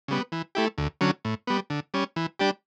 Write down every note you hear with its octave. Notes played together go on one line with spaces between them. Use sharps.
C#3 G3 B3
E3
A3 E4 G4
D2
D3 F#3 C#4
A2
G3 B3
D3
G3 C#4
E3
G3 D4 G4